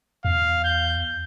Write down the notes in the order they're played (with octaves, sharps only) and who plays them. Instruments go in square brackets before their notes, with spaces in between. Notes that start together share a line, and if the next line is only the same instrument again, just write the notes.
[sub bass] E2 [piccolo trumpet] F5
[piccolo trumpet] G6